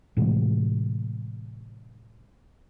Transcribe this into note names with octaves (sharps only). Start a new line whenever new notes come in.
A2 C3 E3 G#3